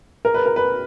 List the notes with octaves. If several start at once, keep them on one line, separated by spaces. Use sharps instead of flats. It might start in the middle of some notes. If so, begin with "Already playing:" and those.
A#4
B4
A#4
B4